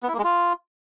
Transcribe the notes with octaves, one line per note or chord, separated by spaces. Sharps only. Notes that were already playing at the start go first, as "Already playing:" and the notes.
B3
E4
A#3
G#3
F4